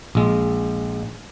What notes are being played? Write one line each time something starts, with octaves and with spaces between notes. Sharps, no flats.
A#1 G#3